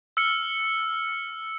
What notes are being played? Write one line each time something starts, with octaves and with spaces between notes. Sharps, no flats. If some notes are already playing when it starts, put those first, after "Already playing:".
E6 F6 C#7